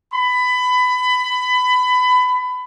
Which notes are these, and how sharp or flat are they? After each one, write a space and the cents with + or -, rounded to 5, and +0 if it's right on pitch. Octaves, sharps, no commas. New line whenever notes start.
B5 +20